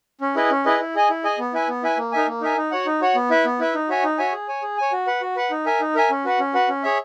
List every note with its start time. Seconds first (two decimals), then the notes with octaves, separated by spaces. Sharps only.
0.21 C#4
0.36 E4 G#4 B4 D#5
0.50 C#4
0.65 E4 G#4 B4 D#5
0.80 E4
0.95 G#4 D#5 G#5
1.10 E4
1.24 G#4 D#5 G#5
1.39 B3
1.53 E4 B4 E5 G#5
1.68 B3
1.83 E4 B4 E5 G#5
1.98 A#3
2.12 D#4 A#4 E5 G#5
2.27 A#3
2.41 D#4 A#4 E5 G#5
2.57 D#4
2.71 F#4 C#5 F#5
2.86 D#4
3.01 F#4 C#5 F#5
3.15 B3
3.30 E4 B4 E5
3.45 B3
3.59 E4 B4 E5
3.74 D#4
3.89 F#4 C#5 E5 G#5
4.04 D#4
4.18 F#4 C#5 E5 G#5
4.33 G#4
4.48 C#5 G#5
4.63 G#4
4.78 C#5 G#5
4.92 F#4
5.07 B4 F#5
5.21 F#4
5.36 B4 F#5
5.51 D#4
5.66 A#4 E5 G#5
5.80 D#4
5.95 A#4 E5 G#5
6.10 C#4
6.25 F#4 B4 F#5
6.39 C#4
6.54 F#4 B4 F#5
6.69 C#4
6.83 G#4 C#5 E5